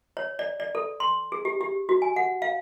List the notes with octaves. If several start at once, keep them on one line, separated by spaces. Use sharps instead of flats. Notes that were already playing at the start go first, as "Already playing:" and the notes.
C#5
D5
D5
A4
C6
G#4
G4
G4
F#4
G#5
F#5
F5